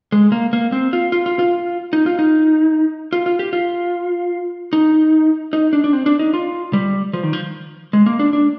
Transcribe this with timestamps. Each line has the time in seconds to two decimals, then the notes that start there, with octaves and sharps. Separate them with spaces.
0.12 G#3
0.32 A#3
0.53 A#3
0.72 C4
0.93 F4
1.12 F4
1.26 F4
1.39 F4
1.93 D#4
2.06 F4
2.19 D#4
3.13 F4
3.26 F4
3.39 G4
3.53 F4
4.73 D#4
5.53 D#4
5.73 D4
5.84 D4
5.93 C4
6.06 D4
6.19 D#4
6.34 F4
6.73 G3
7.13 F3
7.23 D#3
7.33 F3
7.93 G#3
8.06 A#3
8.19 D4
8.33 D4